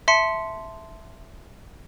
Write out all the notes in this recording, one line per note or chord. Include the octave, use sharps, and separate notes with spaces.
E5 A5 C6 C#7